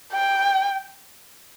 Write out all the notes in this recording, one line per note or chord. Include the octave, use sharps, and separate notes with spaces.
G5